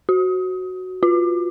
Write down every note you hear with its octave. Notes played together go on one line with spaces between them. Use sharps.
F#4
F4